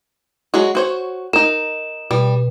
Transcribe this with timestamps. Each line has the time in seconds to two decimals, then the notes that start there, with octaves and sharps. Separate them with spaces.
0.54 F#3 G#3 F#4
0.75 F#4 C5 C#5
1.33 D#4 A#4 E7
2.11 B2 G3